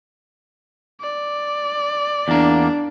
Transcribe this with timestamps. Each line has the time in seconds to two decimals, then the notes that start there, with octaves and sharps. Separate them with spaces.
1.01 D5
2.28 E2 A#3 D4